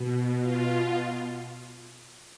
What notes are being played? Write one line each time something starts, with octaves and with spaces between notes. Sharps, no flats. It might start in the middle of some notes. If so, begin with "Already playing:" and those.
Already playing: B2
F4